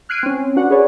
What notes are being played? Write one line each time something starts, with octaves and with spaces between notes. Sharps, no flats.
F6 F#6 G#6 C7 D7 D#7
C4 C#4
D4 F#4 B4 F#5
G#4 B4 C#5 D5